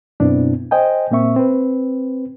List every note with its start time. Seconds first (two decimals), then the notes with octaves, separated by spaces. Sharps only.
0.20 F#2 B2 B3 C4 D4 E4
0.71 C5 D#5 G5 G#5
1.11 A#2 A#3 C4 E5 C#6
1.36 C4 B4